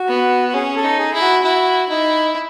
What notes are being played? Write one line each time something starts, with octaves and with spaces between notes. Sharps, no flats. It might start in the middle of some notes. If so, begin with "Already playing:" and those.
Already playing: F#4
B3
F#4
C#4 G#4
A4
D#4
G#4
E4
F#4
E4 F#4
D#4 E4